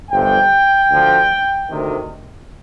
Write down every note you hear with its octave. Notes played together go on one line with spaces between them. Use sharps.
G1 F2 C3 G5
D2 D3 F3
D2 C3 D#3